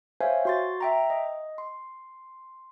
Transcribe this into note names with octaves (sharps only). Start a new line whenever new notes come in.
C5 C#5 E5 F5 G#5
F#4 C6 A6
E5 G5 A#5
D#5
C6